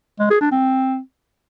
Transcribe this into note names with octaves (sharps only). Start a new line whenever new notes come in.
G#3
G#4
D4
C4